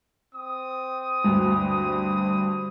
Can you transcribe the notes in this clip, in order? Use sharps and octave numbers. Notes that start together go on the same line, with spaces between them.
C4 D#6
D2 G2